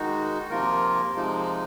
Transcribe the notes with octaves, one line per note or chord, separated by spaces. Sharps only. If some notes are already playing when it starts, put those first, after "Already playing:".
Already playing: D#3 G#3 D#4 F#4
C3 F3 A#3 F4 A#4
C3 F3 G#3 D#4